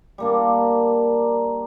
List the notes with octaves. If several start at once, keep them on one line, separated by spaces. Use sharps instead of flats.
G3 A#3 D4